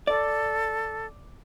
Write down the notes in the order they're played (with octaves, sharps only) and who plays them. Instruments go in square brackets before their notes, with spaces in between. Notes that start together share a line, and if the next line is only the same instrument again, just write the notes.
[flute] A4 [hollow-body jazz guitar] D5